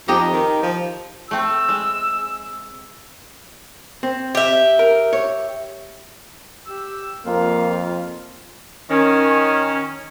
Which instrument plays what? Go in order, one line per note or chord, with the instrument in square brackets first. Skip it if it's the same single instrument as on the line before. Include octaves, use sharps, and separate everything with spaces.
[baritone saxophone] F2 [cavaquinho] D#4 G4 D#5
[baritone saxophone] D#3
F3
[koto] A3 C4 [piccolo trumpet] E6
[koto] G#3
[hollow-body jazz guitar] C4
[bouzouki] G4 E5
[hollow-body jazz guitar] A#4
C#5
[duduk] G4 [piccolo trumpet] E6
[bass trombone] F2 [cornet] A#3 [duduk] F4 [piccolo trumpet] F5
[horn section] D#3 C#4